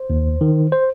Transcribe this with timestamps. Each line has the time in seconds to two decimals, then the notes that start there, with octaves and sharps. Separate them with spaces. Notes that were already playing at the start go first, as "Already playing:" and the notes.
Already playing: C5
0.10 D#2
0.41 D#3
0.72 C5